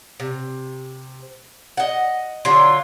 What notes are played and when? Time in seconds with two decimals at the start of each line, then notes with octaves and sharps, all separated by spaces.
0.20 C3
1.77 D#5 F#5
2.45 D3 F#3 F4 C6